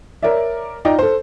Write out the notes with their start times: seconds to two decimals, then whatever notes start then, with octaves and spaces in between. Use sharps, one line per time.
0.23 A#4 C#5 D5 E5
0.85 D#4 F4 D5 D#5 G5 A#5
0.99 A4 C5